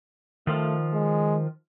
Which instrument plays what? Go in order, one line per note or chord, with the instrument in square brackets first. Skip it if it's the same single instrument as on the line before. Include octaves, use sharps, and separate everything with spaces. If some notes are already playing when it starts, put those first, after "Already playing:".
[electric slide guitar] D#3 F3 F4 [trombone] A3
[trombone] G#3